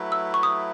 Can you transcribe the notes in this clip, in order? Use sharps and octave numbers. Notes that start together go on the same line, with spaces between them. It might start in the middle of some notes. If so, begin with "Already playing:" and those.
Already playing: F#3 A3 E4 B4
E6
C#6
D#6